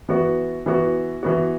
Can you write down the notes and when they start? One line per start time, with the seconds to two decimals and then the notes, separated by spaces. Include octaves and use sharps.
0.09 E3 B3 F#4
0.66 E3 B3 F#4
1.23 E3 B3 F#4